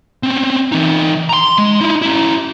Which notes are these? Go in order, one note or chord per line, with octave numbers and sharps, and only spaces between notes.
C4 C#4
E3 D#4
A#5 C6
G#3
D#4 E4
C#4 E4